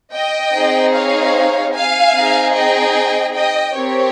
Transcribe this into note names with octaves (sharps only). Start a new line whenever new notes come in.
D#5 G5
C4 D#4 G#4
C#5 F5
F5 G#5
C4 D#4 G#4
D#5 G5
D#5 G5
C4 G4 A#4 C#5